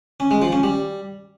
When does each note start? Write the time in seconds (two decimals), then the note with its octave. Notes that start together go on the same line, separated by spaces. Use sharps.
0.20 C#4
0.31 G#3
0.42 F3
0.53 C#4
0.63 G3